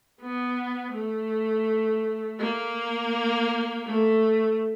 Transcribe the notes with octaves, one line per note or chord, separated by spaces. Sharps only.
B3
A3
A#3
A3